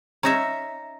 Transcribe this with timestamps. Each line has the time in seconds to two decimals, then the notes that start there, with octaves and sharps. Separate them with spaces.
0.23 C#4 D#4 E5 A#5 A#6